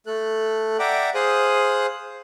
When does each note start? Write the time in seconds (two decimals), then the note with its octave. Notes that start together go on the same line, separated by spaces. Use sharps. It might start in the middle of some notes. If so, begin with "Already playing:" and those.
0.06 A3 A4 F#6
0.79 D5 E5 F#5 G5 A#5 D6
1.14 G#4 C5 F5 D#6 F#6